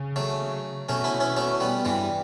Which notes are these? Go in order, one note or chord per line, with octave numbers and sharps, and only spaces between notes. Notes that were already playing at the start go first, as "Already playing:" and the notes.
Already playing: C#3
F#3 A3
B2 A3 C#4
C#4 E4
C#4 E4
A3 C#4
G3 B3
G2 E3 G3